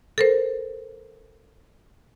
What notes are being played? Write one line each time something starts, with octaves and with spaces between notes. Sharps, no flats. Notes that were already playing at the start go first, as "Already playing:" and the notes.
A4 A#4 C5